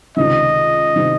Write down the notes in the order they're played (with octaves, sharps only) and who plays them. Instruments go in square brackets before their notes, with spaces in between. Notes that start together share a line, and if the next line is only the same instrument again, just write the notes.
[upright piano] C#2 C3 D#3 [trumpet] D#5
[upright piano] C3 D#3